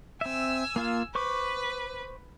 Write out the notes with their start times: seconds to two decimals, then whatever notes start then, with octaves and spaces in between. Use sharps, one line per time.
0.21 C4 E5 G#5 E6
0.76 A#3 F4 F5
1.15 B4 C5 C#6 D6